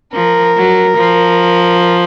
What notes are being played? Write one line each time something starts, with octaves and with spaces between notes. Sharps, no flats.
F3 A#4
F#3
F3